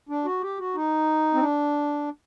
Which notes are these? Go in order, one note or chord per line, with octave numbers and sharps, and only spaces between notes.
D4
F#4
G4
F#4
D#4
C4
D4